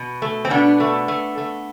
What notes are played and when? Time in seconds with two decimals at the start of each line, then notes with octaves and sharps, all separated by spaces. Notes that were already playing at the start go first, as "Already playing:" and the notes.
Already playing: B2
0.22 A3
0.45 C4
0.50 B2 B3 D4
0.80 A3
1.08 A3
1.38 A3